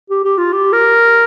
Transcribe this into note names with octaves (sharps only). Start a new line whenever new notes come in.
G4
G4
F4
G4
A#4